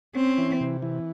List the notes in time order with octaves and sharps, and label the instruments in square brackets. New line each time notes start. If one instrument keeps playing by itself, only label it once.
[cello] C4 [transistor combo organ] C#4
[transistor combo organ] E3
C3
E3